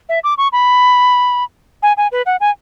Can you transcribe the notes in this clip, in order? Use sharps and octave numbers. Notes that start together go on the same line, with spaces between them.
E5
D6
C#6
B5
G#5
G#5
B4
F#5
G#5